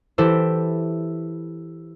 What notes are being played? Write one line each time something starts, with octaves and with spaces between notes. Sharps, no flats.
E3 E4 G4 A4 C5